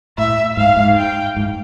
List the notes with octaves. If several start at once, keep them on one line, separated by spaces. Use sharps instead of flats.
A2 E5
G#2 F5
G#2
G5
G#2